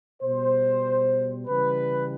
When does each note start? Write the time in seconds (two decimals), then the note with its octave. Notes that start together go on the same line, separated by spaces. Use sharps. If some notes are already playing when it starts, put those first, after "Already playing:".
0.22 B2 G3 C5
1.47 C#3 E3 G3 B4